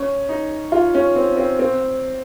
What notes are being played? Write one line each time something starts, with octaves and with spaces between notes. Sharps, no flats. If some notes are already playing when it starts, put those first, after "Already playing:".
Already playing: C#4
D#4
F4
C#4
C4
C4
C4